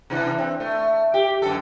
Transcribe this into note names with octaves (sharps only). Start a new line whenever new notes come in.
C3 E3 D4
C4
A3
G4
F#2 D3 A4